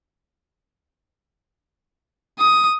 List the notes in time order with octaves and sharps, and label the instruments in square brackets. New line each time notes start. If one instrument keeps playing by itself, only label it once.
[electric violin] D#6